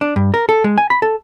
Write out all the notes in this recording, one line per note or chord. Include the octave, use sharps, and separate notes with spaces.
D4
G2
A#4
A4
G#3
G#5
B5
A4